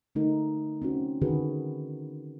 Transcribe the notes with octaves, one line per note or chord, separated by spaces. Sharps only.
D3 A3 D#4 A#4
C4 C#4 F#4
D3 D#3 F#4 G#4 B4